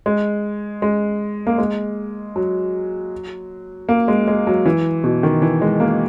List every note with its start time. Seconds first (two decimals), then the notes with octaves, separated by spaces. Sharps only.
0.06 G#3
0.82 G#3
1.47 A#3
1.58 G#3
2.36 F#3
3.89 A#3
4.08 G#3
4.28 G#3
4.47 F#3
4.65 E3
5.04 B2
5.23 D#3
5.42 E3
5.62 G#3
5.80 A#3